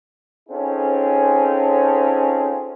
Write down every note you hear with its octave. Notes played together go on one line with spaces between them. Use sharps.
C4 C#4 D#4 F4 G#4 A4